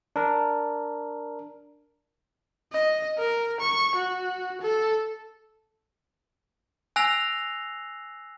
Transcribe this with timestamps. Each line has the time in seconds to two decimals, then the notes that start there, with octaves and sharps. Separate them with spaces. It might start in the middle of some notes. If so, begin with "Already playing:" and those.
0.16 D4 A#4
2.73 D#5
3.18 A#4
3.60 C#6
3.96 F#4
4.61 A4
6.96 G#5 E6 F#6 A#6 C7 F7